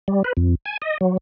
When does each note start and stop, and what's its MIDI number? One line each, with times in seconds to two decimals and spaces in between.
0.08 0.23 55
0.24 0.33 71
0.37 0.55 41
0.66 0.77 80
0.82 0.98 75
1.01 1.17 54